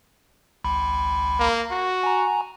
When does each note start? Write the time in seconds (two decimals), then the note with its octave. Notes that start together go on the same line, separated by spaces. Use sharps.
0.64 G#1 C#2 B5
1.39 A#3
1.71 F#4
2.03 G#5 A#5